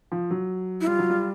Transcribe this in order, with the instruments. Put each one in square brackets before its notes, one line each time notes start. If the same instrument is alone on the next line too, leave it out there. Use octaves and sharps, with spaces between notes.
[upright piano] F3
F#3
[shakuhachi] E4
[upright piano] G3 [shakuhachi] F4
[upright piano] F#3
G3